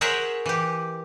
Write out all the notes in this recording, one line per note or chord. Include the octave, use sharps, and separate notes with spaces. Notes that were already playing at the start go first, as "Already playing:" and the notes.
G#4 A#4 C5 C#5 E5 F#5
E3 G4